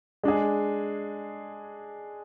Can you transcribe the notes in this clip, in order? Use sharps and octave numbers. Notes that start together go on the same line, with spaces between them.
G#3 D4 G#4